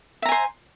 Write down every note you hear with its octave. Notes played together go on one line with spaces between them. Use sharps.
C5 E5 G#5 A#5